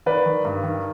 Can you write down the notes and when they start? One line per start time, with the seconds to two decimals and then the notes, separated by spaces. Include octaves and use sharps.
0.06 D#3 B4 D5
0.26 D#3
0.45 G2
0.63 D#3